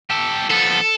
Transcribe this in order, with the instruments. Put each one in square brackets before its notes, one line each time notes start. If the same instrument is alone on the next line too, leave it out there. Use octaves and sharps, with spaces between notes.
[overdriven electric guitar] G4 A4
[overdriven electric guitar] F3 B3 [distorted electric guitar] A4